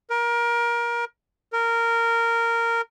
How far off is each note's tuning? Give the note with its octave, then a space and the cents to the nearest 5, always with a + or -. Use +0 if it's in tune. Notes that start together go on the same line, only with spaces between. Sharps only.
A#4 +25
A#4 -10